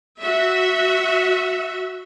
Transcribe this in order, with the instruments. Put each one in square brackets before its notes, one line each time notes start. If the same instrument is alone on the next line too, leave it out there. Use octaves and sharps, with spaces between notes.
[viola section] F#4 E5